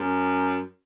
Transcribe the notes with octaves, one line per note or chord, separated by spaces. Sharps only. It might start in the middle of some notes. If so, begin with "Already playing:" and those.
Already playing: F#2